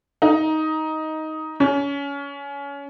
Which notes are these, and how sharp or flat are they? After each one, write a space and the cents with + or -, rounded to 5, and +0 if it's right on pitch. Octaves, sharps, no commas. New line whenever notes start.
D#4 +10
C#4 +25